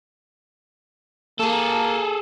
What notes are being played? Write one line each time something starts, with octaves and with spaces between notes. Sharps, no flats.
A#3 G#4 A4